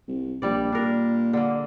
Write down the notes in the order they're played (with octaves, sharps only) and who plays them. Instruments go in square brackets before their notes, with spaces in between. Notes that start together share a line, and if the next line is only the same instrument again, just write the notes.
[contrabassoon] C2
[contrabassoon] A#1 [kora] G3 D5
[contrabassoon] A#2 [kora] D4 A#4
[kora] D3 A#3